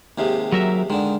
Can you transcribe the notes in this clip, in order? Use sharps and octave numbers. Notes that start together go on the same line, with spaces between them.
D#2 C3 G#3
F#3 A#4 E5
D3 D#3 G#3